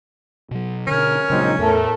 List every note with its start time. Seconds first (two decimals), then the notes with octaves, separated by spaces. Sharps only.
0.51 B2 F#3
0.87 B2 D3 C#4 A#4 F6
1.30 A#1 C#3 F#3 G#3 C4 D#4
1.59 E2 A2 A3 A4 A#4